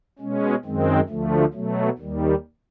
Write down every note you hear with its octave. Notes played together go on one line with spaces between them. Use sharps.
B2 G#3 C#4
F#2 D#3 G#3 C4
D2 D3 F3 A3
B2 F#3 A3
D#2 D#3 G3